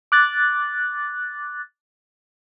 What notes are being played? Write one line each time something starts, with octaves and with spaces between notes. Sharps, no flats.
D6 F#6 A6